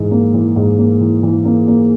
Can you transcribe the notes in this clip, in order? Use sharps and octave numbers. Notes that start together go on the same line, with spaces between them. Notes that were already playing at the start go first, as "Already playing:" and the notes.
Already playing: G#2 E3
A#3
E3
G#2
A#3
E3
E3
A#3
A#3